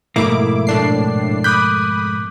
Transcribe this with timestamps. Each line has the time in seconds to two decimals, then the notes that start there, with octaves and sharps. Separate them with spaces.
0.16 F2 G#2 B2 A3 A#3 E4 D6
0.67 A2 D4 C7
1.44 B5 D6 D#6 F#6 G6